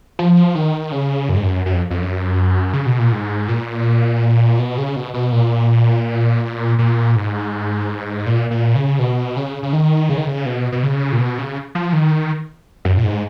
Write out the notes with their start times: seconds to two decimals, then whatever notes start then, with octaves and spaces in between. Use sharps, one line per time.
0.19 F3
0.55 D#3
0.92 C#3
1.29 F#2
1.36 G#2
1.43 F#2
1.66 F#2
1.74 F2
1.90 F2
2.02 F#2
2.74 C#3
2.86 B2
2.99 A#2
3.12 G#2
3.48 A#2
4.59 B2
4.78 C#3
4.96 B2
5.14 B2
5.32 A#2
6.79 A#2
7.16 G#2
8.26 A#2
8.51 A#2
8.75 C#3
8.99 B2
9.36 C#3
9.63 C#3
9.73 D#3
10.09 C#3
10.17 D#3
10.27 C#3
10.46 B2
10.72 B2
10.83 C#3
11.12 A#2
11.19 B2
11.38 C#3
11.75 F3
11.93 D#3
12.85 F#2
12.97 A#2
13.04 G#2